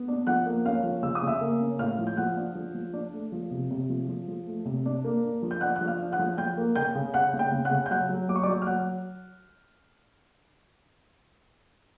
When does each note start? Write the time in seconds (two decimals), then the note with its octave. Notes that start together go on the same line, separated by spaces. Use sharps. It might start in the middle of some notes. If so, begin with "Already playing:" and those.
Already playing: B3
0.08 D4
0.27 F3 F#5 F#6
0.46 A#3
0.66 C#4 F5 F6
0.83 F3
1.03 C#3 E6
1.15 D#6
1.23 C#3 E5 E6
1.41 A#3
1.60 C#4
1.79 A2 F5 F6
1.99 F3
2.07 G6
2.17 F3 F#5 F#6
2.37 D4
2.55 F3
2.74 F3
2.94 D4
3.14 A3
3.32 F3
3.51 C3
3.71 C3
3.89 F3
4.08 F3
4.28 F3
4.47 A3
4.65 C3
4.86 D4
5.04 A#3
5.23 D4
5.42 F3
5.51 G6
5.61 D4 F#5 F#6
5.76 F3 F#6
5.87 F5 F6
6.00 D4
6.12 F#5 F#6
6.19 F3
6.37 F3 G5 G6
6.58 A#3
6.75 C#3 G5 G6
6.95 C#3
7.14 C#3 F#5 F#6
7.34 C#3
7.39 G5 G6
7.52 C#3
7.65 F#5 F#6
7.71 C#3
7.86 G6
7.90 F#3 F#5 F#6
8.09 F#3
8.29 F#3 D6
8.36 C#6
8.43 D5 D6
8.48 F#3
8.62 F6
8.67 F#3 F#5 F#6